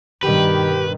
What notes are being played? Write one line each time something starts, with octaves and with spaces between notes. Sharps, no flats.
G2 B2 D#3 G4 B4